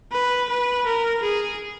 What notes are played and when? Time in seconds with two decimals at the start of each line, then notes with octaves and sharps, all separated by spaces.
0.12 B4
0.49 B4
0.86 A#4
1.22 G#4